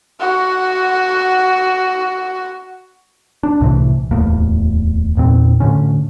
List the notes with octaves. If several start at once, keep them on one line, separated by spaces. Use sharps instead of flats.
F#4 F#5
D4
C2 A2 C3 E3
D1 E2 A2 A#3
E2 A#2 C4
A2 D3 C#4